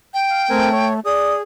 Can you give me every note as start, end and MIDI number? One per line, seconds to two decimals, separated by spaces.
0.14 0.88 79
0.30 0.45 77
0.49 1.00 57
0.49 0.69 60
0.49 0.69 70
0.49 0.69 80
0.72 0.93 73
1.05 1.42 68
1.05 1.33 74
1.05 1.37 87